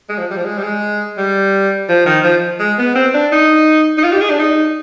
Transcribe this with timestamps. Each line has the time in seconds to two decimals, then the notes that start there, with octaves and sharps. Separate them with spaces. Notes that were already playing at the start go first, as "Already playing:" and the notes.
0.09 G#3
0.18 F3
0.31 G3
0.36 F3
0.45 G#3
0.58 G3
0.63 G#3
1.17 G3
1.88 F3
2.06 D#3
2.23 F3
2.59 G#3
2.78 B3
2.95 C4
3.14 D4
3.32 D#4
3.97 D#4
4.04 F4
4.12 G4
4.20 G#4
4.30 D4
4.39 D#4